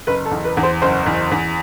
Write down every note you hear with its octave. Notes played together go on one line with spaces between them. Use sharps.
F#1 B4
A4
E2
B4
E2
C5
F#1 C5
E2
E2